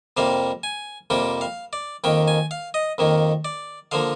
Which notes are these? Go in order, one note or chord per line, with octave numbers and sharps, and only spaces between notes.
F2 C3 G3 A#3 F5
G#5
F2 C3 G3 A#3 G5
F5
D5
F2 D#3 A#3 G5
G#5
F5
D#5
F2 D#3 A#3
D5
D3 F3 A#3 F5